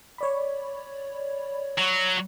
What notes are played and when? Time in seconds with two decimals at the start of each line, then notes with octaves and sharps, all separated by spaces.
0.18 C#5 D5 B5
1.78 F#3